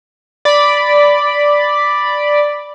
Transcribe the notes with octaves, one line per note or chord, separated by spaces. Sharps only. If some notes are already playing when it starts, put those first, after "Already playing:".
D5 B5